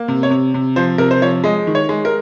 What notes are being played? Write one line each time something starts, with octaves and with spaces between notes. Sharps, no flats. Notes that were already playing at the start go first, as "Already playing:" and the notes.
Already playing: A#3
C3
C#5
C3
C3
F3 C5
C3 A#4
C5
F3 C#5
G#3 D#5
D#3
C#5
G#3
A#4